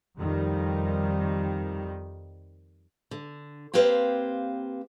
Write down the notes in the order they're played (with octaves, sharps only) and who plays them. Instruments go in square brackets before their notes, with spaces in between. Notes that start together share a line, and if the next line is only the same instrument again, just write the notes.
[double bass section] F2 D#3 G3
[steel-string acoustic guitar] D3
A#3 C4 G4 B4 C5 F5